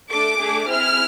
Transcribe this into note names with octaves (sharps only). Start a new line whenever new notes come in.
A3 D4 A4 D6
A3 D4 G#4
C4 E4 G#4 F6